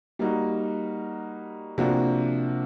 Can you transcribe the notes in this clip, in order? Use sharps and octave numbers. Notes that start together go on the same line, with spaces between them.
G3 A#3 D#4 F#4
C3 F3 A#3 D4 F#4